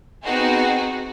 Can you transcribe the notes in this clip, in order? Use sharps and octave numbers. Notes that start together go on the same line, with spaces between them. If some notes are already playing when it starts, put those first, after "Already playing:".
B3 C4 D#4 F#4 G#4